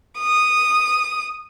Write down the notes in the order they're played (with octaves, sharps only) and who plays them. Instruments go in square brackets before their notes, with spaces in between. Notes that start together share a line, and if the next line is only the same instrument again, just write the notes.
[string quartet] D#6